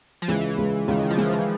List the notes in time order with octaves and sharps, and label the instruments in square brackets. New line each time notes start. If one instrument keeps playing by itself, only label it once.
[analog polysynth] F3
[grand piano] C#2 [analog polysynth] E3
[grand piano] C#2
[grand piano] C#2 [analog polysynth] D#3
[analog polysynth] D#3
F3
[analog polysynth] E3 [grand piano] G#3
[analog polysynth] F3